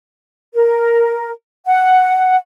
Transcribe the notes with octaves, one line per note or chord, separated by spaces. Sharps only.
A#4
F#5